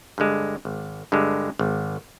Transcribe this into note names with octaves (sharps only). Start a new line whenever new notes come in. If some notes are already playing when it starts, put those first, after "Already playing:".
G2 D3 G#3
G#1
G2 D3 G#3
G#1